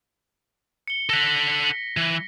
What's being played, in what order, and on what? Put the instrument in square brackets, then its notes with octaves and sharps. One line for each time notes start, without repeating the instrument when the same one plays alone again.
[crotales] C#7 G7
[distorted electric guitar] A4 F#5 [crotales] A#6 B6
[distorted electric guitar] E3